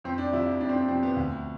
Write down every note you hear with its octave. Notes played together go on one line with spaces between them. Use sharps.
F2 C4
D4
C3 F3 E4
E4
F2 D4
C4
D4
C3 F3 C4
B3
D2